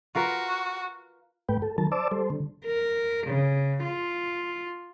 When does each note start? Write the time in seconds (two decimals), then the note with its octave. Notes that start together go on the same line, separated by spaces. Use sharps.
0.15 F4 F#4 A#4 B4
1.49 G#2 A3 B4 G5
1.62 A4
1.78 D#3 F#3 A#4 A5
1.92 C5 D5 A5 D6 E6
2.12 G3 A4 C5
2.30 D3
2.65 A#4
3.27 C#3
3.83 F4